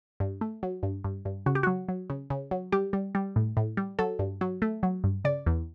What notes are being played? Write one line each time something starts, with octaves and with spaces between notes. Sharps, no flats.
G2
A3
F#3
G2
G2
G2
C#3 F#4
G4
F#3 F#4
F#3
C#3
C#3
F#3
G3 G4
G3
G3
A2
A2
G3
F#3 A4
G2
F#3
A3
F#3
G2
C#3 D5
E2